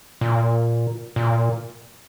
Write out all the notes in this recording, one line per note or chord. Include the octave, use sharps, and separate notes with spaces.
A#2
A#2